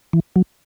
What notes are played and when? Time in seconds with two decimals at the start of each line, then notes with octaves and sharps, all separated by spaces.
0.13 E3
0.36 F#3